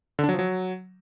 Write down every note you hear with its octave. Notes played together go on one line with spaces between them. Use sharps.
D3
D4
F#3
F3
F#3